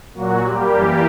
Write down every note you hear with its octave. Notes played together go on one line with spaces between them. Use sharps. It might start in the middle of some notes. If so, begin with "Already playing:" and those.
A#2 F#3 A#3 F#4
A#2 G3 A#3 G4
F#2 E3 G3 A#3